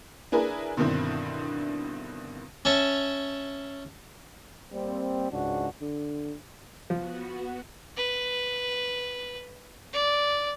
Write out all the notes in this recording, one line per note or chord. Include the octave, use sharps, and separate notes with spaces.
D4 E4 G#4 A#4 B4
G2 B2 D3 D#3 C4 E4
C#4 C#5 E5 A5
G3 A#3 C4
C#2 G#2 D4 F#4
D3
F3 B3 F#4
B4
D5